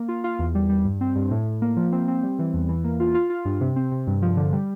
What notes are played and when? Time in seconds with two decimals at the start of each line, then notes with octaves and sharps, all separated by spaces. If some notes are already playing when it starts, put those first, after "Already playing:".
Already playing: A#3
0.08 F4
0.24 F4
0.39 E2
0.55 G3
0.69 G3
0.85 G2
1.01 C4
1.15 G2
1.31 A2
1.46 A2
1.62 A#3
1.76 F3
1.92 C4
2.08 C4
2.23 G3
2.39 E3
2.54 E2
2.69 E3
2.84 A#3
3.00 F4
3.14 F4
3.30 F4
3.45 G2
3.61 C3
3.76 C4
3.92 C3
4.07 G2
4.22 F3
4.37 D3
4.53 G3